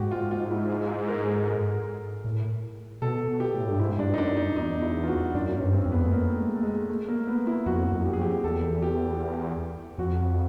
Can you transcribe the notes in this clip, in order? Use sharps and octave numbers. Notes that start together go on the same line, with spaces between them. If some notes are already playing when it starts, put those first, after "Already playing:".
Already playing: G#2 F#4 G4
F4
F4
E4
G#4
G#4
A#4
G#4
A4
A#4
A2
B2 A4
B2
G4
A2
G2
G#2 E4
G2 D4
F2 D#4
F#2 D4
D#4
E2 D#4
E4
F4
F#4
F#2 D4
C#4
G2
C4
F2
B3
A3
A#3
G#3
A3
G#3
A3
A#3
B3
E4
F2 F#4
F#2
G4
G#4
F2 G4
E2 A4
G4
F2 F#4